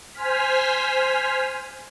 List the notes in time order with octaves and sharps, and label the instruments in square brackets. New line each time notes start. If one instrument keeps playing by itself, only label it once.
[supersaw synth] C5 G#5 F6 B6